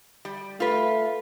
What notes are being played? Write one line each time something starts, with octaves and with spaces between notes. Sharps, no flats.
G3
A3 F4 B4